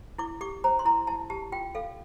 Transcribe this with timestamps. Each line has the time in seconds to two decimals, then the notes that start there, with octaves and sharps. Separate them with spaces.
0.18 E4 D6
0.41 G4 D6
0.64 C5 A#5
0.79 C6
0.85 E4 A#5
1.07 E4 A5
1.30 G4 A5
1.52 F4 G5
1.75 A4 F5